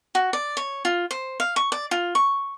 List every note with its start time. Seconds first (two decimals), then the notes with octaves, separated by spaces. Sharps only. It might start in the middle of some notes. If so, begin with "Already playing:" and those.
0.15 F#4
0.33 D5
0.57 C#5
0.85 F4
1.11 C5
1.40 F5
1.56 C#6
1.72 D5
1.91 F4
2.15 C#6